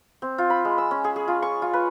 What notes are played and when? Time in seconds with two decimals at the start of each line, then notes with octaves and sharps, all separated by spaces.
0.22 C4
0.38 F4
0.50 B5
0.65 G#3
0.78 E6
0.91 C#4
1.04 G#4
1.16 G#4
1.28 F4
1.42 C#6
1.62 F4
1.73 B4